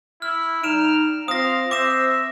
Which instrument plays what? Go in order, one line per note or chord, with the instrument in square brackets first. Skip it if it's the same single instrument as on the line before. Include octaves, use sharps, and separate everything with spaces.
[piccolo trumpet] E4 [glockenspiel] F6
[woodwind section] G3 D#4 [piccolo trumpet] F6 [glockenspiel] D7 E7
[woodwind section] C4 F4 [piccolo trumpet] F5 [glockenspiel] D#6 A#6
[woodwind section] C4 C5 [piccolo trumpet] E5 [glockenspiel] D6 A#6 E7